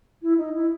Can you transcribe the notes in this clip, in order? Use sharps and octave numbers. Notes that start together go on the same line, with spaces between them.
E4
D#4
E4